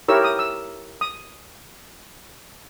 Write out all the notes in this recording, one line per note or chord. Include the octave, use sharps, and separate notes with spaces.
E4 G4 A#4 C#5 E6
D#6
E6
D#6